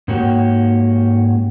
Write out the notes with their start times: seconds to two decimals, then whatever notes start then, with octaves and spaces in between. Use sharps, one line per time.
0.08 G#2 A#3 C#4 F#4 G4